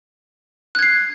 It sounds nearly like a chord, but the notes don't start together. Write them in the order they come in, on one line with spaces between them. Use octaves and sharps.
F#6 G#6 C7